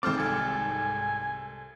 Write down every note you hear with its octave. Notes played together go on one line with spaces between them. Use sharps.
G#1 G#2 C4 A4 C5 D6 F6 A6
C2 A4 G#5